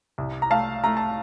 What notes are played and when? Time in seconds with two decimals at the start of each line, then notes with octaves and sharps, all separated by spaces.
0.18 C2
0.42 A#5
0.50 A3 F5 A5
0.84 A3 A#5
0.97 A5